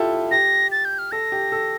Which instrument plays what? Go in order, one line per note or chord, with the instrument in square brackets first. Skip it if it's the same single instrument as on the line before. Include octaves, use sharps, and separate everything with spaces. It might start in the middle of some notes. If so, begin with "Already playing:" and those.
Already playing: [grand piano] E4 F4 G4 A4
[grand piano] G4 [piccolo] A#6
[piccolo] A6
G6
F6
[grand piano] A4 [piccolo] A#6
[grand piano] G4
A4